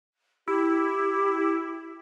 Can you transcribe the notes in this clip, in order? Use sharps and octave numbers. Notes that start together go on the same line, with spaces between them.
E4 G4